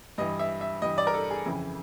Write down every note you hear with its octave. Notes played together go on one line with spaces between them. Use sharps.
G2 E3 D#5
E5
E5
G2 E3 D#5
D5
A#4
A4
G#4
F2 C#3 E3